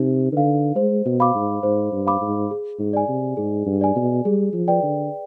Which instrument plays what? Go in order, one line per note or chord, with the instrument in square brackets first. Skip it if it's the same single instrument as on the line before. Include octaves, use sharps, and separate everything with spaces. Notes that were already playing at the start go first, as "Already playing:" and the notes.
Already playing: [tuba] C3 [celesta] D#4
[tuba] D3 [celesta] B4 F5
[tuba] G#3 [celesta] C5
[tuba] B2
[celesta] F5 B5 D6
[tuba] G#2
[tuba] G#2 [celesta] C5
[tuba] G2
[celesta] F5 B5 D6
[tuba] G#2
[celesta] G#4
[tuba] G#2
[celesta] D5 G#5
[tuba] C3
[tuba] G#2 [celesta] G#4
[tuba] G2
[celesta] D5 G#5
[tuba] B2
[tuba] G3 [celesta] G#4
[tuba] F3
[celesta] B4 D5 G5
[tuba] D3